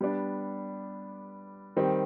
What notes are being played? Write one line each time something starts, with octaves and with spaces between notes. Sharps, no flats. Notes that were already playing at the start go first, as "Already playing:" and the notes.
G3 B3 D4
D#3 G3 C4